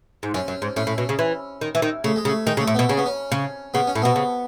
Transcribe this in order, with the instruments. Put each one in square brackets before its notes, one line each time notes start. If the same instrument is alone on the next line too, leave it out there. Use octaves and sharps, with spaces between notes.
[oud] G#2
[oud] F#2 [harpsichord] C#4
[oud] F#2
G#2
[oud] A2 [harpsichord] C#4
[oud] A2
B2
C#3
E3
D#3
E3
D#3
[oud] C#3 [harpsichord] A3
[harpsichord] G#3
[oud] C#3
[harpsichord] A3
[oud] D#3 [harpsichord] G#3
[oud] C#3
[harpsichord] A3
[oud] A2
[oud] B2 [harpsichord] B3
[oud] C#3 [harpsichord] C#4
[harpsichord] B3
C#4
[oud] C#3
[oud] C#3 [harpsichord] B3
[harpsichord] C#4
[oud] A2
[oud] B2 [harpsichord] B3
[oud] C#3